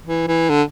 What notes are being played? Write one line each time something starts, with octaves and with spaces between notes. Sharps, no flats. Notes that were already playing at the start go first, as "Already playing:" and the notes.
E3
E3
D3